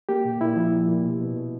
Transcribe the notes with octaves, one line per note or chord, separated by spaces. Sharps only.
A#3 G4
A#2
A#2 E4
F3
A#2
A#2
B2
B2
B2